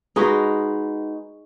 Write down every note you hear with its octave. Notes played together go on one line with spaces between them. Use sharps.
G#3 D#4 F#4 B4